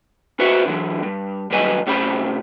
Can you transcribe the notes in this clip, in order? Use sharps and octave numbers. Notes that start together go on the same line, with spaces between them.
F#4 B4 C5 D5 E5 F#5
D3 E3 F#3
G2
G2 D#3 F#3 B4 D#5 G#5
A2 C3 C#4 C5 F5 B5